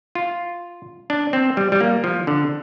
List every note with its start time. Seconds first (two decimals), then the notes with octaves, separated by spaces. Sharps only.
0.15 F4
1.10 D4
1.33 C4
1.57 G3
1.72 G3
1.81 A#3
2.04 F3
2.27 D3